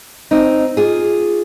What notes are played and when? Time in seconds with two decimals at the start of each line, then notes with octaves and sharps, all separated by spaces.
0.31 C4 D#4
0.77 F4 G#4